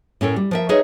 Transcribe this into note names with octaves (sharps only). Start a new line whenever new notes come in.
A2 C#4 A4 A#4
G3
F3 A#4 E5
D#4 G#4 B4 C#5 D#5 E5